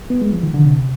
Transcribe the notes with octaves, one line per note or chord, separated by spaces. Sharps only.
B3
G#3
F3
D#3
D3
C3